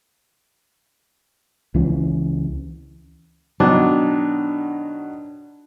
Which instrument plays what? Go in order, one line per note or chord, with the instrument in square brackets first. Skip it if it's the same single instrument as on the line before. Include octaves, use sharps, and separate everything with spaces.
[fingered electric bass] C#2 E3 C#4
[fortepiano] B2 D#3 F#3 [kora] D4